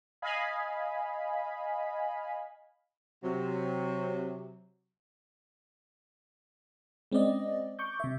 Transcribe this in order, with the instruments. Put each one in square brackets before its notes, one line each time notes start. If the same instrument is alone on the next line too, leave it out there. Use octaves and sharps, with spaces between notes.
[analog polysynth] D#5 F5 G#5 B5
[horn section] C3 F#3
[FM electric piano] G#3 C4 C#4 D5 D#5
C#6 D6 G6
C3 E5